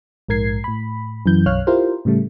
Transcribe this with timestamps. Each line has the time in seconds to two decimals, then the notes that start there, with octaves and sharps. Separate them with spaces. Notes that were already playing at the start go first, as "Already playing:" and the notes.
0.28 A#1 G#2 A#4 G#6 C7
0.64 A2 B5
1.26 F#2 E3 G6
1.46 B1 F#2 C#5 F5 F6 F#6
1.67 E4 F4 G4 A#4 C5
2.05 A2 C#3 G3 A3